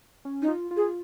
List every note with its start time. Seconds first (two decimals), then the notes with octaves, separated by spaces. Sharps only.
0.25 C#4
0.42 D#4
0.48 F4
0.71 F4
0.76 G#4